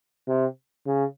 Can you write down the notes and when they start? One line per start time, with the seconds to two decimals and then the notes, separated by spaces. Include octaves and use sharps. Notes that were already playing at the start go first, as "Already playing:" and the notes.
0.28 C3
0.87 C#3